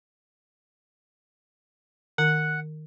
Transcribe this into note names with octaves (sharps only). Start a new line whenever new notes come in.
D#3 F#5